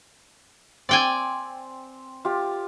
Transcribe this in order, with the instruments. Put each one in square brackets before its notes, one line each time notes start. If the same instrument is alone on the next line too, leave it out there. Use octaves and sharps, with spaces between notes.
[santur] C4 [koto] D5 G5 G#5
[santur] F4 G4